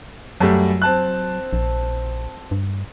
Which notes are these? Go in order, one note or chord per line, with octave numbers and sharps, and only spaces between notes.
F#2 F#3 G3 A3
C4 A5 F#6
A#1
G2